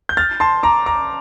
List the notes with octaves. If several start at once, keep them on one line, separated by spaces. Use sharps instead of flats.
G6
F6 A6
A5 C6
A#5 D6
A#5 D6